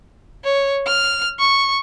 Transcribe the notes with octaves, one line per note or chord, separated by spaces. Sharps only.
C#5
F6
C#6